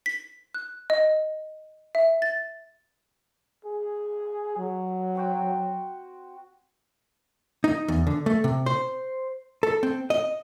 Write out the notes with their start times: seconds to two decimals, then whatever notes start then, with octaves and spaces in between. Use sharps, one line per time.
0.06 B6
0.54 F#6
0.90 D#5
1.95 E5
2.22 A6
3.65 G#4
4.57 F#3
5.15 C4 F#4 G5
7.64 D#4
7.88 E2
8.07 D3
8.26 A3
8.44 C3
8.66 C5
9.63 A4
9.83 C4
10.10 D#5